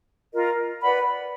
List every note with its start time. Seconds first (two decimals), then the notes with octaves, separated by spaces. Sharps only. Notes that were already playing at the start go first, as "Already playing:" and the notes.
0.34 F4 A#4 D#5
0.82 B4 D5 F#5 B5